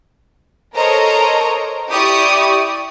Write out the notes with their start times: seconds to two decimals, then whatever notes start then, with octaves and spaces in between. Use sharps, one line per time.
0.76 A4 A#4 C5 C#5 D#5 A#5
1.91 E4 G4 D5 C#6 D#6